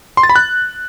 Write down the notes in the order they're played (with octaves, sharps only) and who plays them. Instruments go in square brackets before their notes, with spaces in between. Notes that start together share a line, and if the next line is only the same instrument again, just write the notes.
[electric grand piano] C6
A6
B5
F#6